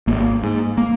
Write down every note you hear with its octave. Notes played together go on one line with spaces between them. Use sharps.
G#1 A#3
G#2
A#3